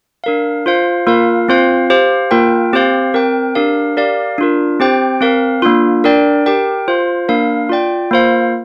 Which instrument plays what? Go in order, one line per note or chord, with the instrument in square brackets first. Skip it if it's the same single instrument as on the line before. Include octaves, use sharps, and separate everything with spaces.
[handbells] D4 A#4 F5
F4 C5 F5
A#3 F4 A#4 F5
C4 F4 C5 F5
G4 C5 F5
A#3 F4 A#4 G5
C4 G4 C5 F5
C4 A#4 G5
D4 G4 A#4 F5
G4 A#4 D5 F5
D4 F4 A#4
C4 G4 C5 G5
C4 A#4 F5
A#3 D4 F4
D4 A#4 D5 G5
G4 A#4 G5
F4 C5 F5
A#3 D4 A#4 F5
F4 D5 G5
A#3 F4 C5 F5